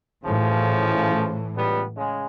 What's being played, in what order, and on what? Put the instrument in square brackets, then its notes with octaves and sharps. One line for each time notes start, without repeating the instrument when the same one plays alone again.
[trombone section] F#2 C#3 F3 [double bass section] A2 E3
[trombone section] C#2 G3 B3
C#3 G#3